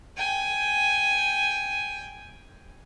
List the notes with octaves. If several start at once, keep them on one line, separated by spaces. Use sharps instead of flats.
G5 G#5